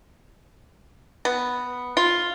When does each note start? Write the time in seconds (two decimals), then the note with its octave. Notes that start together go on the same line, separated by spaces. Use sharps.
1.25 B3
1.97 F4